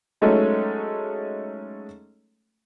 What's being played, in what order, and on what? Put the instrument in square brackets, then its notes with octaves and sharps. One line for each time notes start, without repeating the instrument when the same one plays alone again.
[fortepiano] F#3 G#3 A3 C#4 D#4 A4